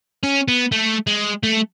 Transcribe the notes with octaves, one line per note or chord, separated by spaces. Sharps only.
C#4
B3
A3
G#3
A3